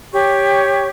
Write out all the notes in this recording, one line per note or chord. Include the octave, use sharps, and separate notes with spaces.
G4 C#5 C#6